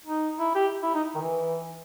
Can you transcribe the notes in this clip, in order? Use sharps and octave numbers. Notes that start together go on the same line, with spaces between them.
D#4
E4
G4
E4
D#4
D#3
E3